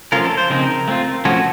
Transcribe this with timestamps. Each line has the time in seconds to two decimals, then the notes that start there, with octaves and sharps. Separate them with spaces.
0.12 F3 A3 C#4 F4 A#4
0.25 A4
0.37 C5
0.50 C#3 F3 C4 D#4 A#4
0.88 A3 C4 F4
1.25 F3 A3 C#4 F#4